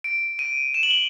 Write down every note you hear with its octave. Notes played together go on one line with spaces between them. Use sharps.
D7
D#7
E7
F#7
G7